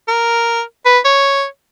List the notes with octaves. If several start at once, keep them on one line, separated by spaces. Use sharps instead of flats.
A#4
B4
C#5